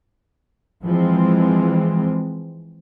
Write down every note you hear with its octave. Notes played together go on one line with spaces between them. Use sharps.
E3 F3 G#3 C4